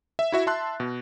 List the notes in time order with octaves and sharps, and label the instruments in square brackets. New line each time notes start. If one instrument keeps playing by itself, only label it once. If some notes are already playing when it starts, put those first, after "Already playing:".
[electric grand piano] E5
E4 F#4 E5
E5 A5 C6 F#6
B2